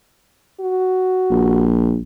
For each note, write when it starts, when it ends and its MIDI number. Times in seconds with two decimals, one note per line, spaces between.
0.60 1.65 66
1.31 2.00 34